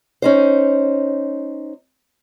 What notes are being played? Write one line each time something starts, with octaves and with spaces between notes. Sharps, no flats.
C#4 D#4 C5